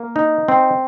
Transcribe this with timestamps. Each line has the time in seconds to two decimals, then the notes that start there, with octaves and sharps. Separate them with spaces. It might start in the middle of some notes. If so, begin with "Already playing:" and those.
Already playing: A#3
0.16 D#4
0.48 C4